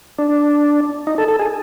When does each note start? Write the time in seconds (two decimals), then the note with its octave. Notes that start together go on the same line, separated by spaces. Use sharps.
0.18 D4
1.07 D#4
1.18 A4
1.28 A4
1.39 G#4